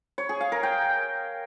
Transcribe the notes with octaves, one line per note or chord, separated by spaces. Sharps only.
C#5
G#4
F5
A#4
G5